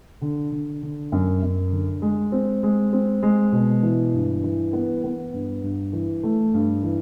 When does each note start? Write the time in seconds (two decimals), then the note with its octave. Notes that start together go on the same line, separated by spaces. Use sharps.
0.21 D3
0.52 D3
0.82 D3
1.12 F#2
1.43 F#2
1.72 D3
2.02 G#3
2.32 C4
2.63 G#3
2.93 C4
3.23 G#3
3.52 B2
3.83 E3
4.14 G2
4.44 E3
4.73 B3
5.04 B3
5.33 G2
5.63 G2
5.93 E3
6.23 A3
6.54 G2
6.83 E3